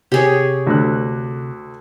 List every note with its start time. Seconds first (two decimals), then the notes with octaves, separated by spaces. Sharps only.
0.12 C3 G4 G#4 C#5
0.67 D2 A3 F#6